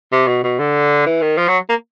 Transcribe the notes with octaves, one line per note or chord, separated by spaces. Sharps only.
C3
B2
B2
D3
E3
D#3
F3
F#3
A#3